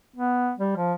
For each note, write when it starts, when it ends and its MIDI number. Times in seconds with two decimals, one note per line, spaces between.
0.16 0.52 59
0.58 0.74 55
0.77 0.93 53